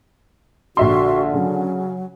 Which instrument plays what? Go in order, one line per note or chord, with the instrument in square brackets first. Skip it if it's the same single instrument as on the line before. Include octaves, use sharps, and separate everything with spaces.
[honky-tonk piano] A#1 E5 C6 [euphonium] D3 [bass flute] F#4
[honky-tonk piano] C#3 [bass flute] F#3